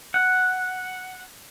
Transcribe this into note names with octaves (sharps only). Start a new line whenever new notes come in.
F#5